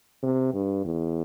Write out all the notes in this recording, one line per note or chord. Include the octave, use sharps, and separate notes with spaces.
C3
G2
E2